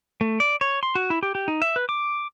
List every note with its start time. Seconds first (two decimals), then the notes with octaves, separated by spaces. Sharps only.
0.21 A3
0.40 D5
0.61 C#5
0.83 C6
0.95 F#4
1.10 E4
1.23 G4
1.35 G4
1.48 D#4
1.62 E5
1.76 B4
1.89 D6